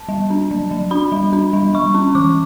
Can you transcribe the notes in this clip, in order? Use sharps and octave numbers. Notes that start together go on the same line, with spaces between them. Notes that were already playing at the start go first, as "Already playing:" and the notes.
Already playing: A5
G3
D4
F#3
F#3
D4 B5
G3
D4
G3
G3 C#6
C#4
E3 D6